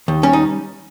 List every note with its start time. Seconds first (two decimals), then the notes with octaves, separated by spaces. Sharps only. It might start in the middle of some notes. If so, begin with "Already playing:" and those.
0.08 D#2
0.23 G3 C#4
0.33 D#4